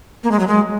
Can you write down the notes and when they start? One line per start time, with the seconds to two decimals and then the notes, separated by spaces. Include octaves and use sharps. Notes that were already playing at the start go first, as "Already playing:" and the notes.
0.24 A#3
0.31 G#3
0.39 F#3
0.48 G#3